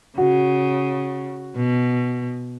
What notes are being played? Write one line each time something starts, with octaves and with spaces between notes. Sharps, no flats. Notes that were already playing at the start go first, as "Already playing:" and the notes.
C#3 F#4
B2